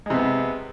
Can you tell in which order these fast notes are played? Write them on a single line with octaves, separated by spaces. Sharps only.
G#3 C3 B3